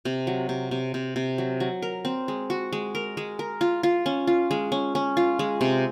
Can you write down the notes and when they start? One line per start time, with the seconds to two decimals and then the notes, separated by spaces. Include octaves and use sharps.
0.05 C3
0.27 F#3
0.49 C3
0.71 C3
0.94 C3
1.16 C3
1.38 F#3
1.60 F#3
1.82 A#4
2.05 C4
2.28 G#3
2.50 F#4
2.73 G#3
2.95 A#4
3.17 G#3
3.39 A#4
3.61 F4
3.83 F4
4.06 C#4
4.27 F4
4.51 G#3
4.72 C#4
4.95 C#4
5.17 F4
5.39 G#3
5.61 C3